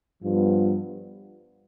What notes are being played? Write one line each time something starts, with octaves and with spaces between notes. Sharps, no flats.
G2 F3 B3 F4